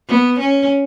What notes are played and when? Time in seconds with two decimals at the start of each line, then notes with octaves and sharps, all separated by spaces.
0.09 B3
0.39 C#4